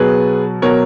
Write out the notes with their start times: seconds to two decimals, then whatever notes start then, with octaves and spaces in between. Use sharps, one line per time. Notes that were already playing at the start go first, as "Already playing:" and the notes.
Already playing: B2 F#3 G#4 B4
0.62 B2 F#3 A#4 C#5